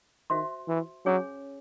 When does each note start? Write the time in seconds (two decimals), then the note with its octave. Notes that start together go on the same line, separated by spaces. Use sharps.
0.30 D#3 F#4 C5 E5 C6
0.68 E3
1.05 F#3 C#4 G#4 C#5 G#5